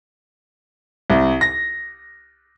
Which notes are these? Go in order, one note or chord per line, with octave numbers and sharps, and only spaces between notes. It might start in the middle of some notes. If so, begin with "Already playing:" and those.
C2
A#6